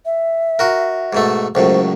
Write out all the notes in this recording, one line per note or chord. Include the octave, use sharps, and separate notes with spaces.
E5
F#4 A#4
G#2 B2 A3
C#2 F#2 A2 C5